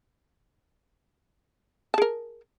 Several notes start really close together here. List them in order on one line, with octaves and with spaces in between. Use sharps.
A5 G#4 A#4